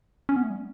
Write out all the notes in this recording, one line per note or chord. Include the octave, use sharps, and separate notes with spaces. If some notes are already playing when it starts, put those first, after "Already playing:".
C#4
B3
A3
G3